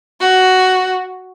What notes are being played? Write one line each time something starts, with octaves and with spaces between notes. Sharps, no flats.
F#4